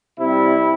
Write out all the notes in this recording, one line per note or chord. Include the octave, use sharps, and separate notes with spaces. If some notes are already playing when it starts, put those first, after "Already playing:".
C3 G3 C4 E4